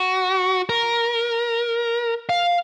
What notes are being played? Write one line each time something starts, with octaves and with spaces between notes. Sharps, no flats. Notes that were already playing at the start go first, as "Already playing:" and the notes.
Already playing: F#4
A#4
F5